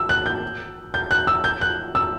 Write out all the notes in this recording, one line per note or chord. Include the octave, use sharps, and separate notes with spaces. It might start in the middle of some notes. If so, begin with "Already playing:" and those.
Already playing: E6
F#6
G6
G6
F#6
E6
G6
F#6
E6